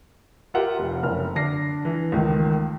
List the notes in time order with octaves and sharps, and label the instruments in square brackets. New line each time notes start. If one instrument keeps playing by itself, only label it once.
[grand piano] F4 G4 A#4 E5 F#5 G5
F1
F#1 F6
D3 D4 A#6 C7
E3
C#2 D#3 A3